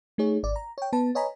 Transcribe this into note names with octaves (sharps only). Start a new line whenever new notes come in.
A3 D#4 G#4 C#5
G#1 D5
A#5
C#5 G5
B3 B4 A5
B4 C#5 D#5 G#5 A#5 B5